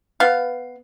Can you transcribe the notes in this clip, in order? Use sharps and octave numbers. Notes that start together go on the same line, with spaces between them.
B3 F5